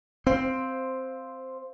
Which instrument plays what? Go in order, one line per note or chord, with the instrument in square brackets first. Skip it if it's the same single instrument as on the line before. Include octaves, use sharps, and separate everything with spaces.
[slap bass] C4 [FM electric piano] C5 F5 C6